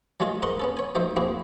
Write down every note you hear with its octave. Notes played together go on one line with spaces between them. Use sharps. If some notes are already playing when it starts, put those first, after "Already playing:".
F#3 G#3 A3 F4 G#4 D#5
G#2 A#4 D#5 F#5 C6 C#6
B3 C#4 A4
C#5 G#5
F3 F#3 A3 D#4 C5 E5
A#3 C4 E4 F#4 G#4